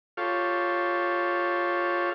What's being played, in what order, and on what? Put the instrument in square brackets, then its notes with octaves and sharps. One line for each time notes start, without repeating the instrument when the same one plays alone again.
[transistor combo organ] F4 G4 A4 C#5 F5